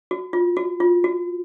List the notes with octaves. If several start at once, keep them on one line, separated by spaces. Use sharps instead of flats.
F#4
F4
F#4
F4
F#4